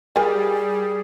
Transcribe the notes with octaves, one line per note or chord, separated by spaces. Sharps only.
G3 F4 G#4 A#4 G#5